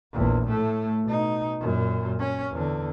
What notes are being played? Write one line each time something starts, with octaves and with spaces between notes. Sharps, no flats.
A#1 E2
A2 A3
B2 D#4
F#2 A#2
C#4
E2 D3